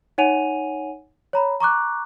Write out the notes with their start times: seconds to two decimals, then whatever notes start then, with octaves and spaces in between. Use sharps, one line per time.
0.18 D#4 C#5 F#5 G#5 D#7 F7
1.33 C#5 A#5 B5
1.60 A#5 C#6 D6 F#6